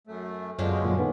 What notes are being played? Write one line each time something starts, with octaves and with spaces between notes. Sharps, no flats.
F#2 A3
F#2 B2 D3 G#3 C#4 D4 F4
G1 A#2 F#3
D#3 B3